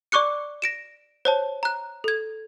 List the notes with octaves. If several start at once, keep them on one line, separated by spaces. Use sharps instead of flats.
D5 C#6 D6 F#6 C#7
A#6 D7 E7
C5 C#5 A5
A#5 F#6
A4 G#6